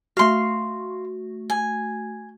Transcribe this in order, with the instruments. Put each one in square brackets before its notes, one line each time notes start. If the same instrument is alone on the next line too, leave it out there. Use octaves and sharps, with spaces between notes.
[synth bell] A3 F#4 [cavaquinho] F5 C6
[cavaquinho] G#5